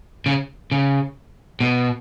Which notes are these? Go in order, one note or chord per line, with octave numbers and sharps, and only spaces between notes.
C#3
C#3
B2